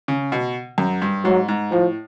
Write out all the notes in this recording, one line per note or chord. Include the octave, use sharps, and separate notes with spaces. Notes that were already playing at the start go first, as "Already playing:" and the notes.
C#3
B2
F#2
G2
G#2 F#3
G#2
A2 F3